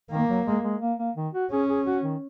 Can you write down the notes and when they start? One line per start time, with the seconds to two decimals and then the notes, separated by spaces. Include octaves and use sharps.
0.11 D#3 A#3
0.29 F#3
0.46 G#3
0.64 G#3
0.81 A#3
0.98 A#3
1.16 D#3
1.34 F#4
1.51 C#4 G#4
1.68 G#4
1.86 F#4
2.04 D#3